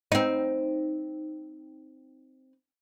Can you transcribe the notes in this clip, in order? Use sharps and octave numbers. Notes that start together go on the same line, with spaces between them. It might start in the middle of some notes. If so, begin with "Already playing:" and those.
C4 D#4